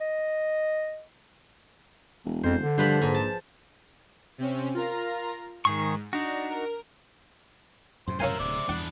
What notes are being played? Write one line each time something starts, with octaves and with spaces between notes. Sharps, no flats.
D#5
E1
F2 C5
D3
G2 F3 B4 C5
A#1 G#2
A5
C3 C4 C#4
F4 A#4 A#5
G#2 D#3 G#4 C#6
D4 D#4 F#4
A#4
F#2 A2 C3 C5
C#4 A#4 C5 E5 F5 G#5
D1 D3 D5
E2 B3 D4 F#5